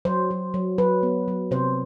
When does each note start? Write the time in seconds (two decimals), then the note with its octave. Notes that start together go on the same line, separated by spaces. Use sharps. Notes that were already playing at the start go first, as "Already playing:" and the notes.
0.05 F#3 C5
0.31 F#3
0.54 F#3
0.78 F#3 B4
1.03 B3
1.28 F#3
1.51 C3 C5